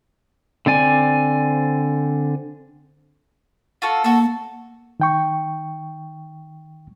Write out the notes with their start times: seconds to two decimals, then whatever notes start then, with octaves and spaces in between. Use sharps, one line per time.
0.66 D3 C4 D5 G#5
3.82 F4 F#4 A4
4.04 A#3 F#4 A4
5.00 D#3 G5 C#6